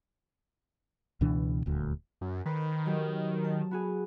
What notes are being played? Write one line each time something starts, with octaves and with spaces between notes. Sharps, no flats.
C#2 B2 E3 D4
D#1 D2
F#2
D#3 B4 C5
F#3 G4
A5
B3 F#4 G#4